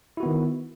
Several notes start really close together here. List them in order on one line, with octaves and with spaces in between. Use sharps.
E4 F#4 B3 D#3